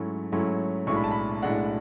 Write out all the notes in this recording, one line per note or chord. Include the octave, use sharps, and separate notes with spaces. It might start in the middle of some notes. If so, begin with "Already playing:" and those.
Already playing: G#2 F#3 A3 C#4 E4
G#2 F#3 A3 C#4 E4
B1 A2 G#3 D4 C#6
B5
A5
B5
B1 A2 G#3 D4 F#5